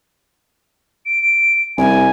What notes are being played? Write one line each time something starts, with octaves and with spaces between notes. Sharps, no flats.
D7
C2 G#5